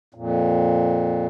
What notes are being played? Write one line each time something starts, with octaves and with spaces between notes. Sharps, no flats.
F2 A#2